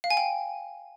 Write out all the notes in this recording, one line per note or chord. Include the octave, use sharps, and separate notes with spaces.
F5
G#5
G5